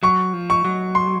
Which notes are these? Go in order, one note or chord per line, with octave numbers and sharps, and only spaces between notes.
F#3 C#6
F3
C#6
F#3
C6